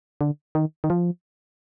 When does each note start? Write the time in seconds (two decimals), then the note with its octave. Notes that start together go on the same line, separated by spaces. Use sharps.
0.21 D3
0.55 D#3
0.84 D#3
0.90 F3